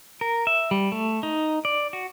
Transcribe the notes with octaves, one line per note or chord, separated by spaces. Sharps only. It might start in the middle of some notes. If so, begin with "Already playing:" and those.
A#4
E5
G3
A3
D#4
D5
F#4